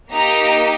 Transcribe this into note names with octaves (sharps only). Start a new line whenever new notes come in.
A#3 D#4 G4 A#5